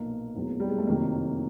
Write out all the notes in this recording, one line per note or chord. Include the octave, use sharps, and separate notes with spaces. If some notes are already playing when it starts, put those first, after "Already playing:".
Already playing: B1 A#2 F3 A#3
F1 E2 B2 F#3
G3
G#3
A3
F#1 F2 C3 D#3 F#3 A#3